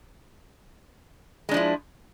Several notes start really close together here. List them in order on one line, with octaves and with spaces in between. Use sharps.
G#3 D4 F3 E4